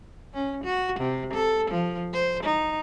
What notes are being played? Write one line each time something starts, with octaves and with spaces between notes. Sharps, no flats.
C#4
F#4
C3
A4
F3
C5
D#4